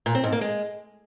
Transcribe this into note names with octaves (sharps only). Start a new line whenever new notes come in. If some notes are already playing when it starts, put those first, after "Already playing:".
A#2
C4
G#2
A#3
G#3